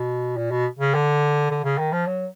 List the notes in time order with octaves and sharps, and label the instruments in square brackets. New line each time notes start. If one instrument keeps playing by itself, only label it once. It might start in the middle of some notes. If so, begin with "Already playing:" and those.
Already playing: [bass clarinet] B2
A#2
B2
C#3
D3
D3
C#3
D#3
F3
F#3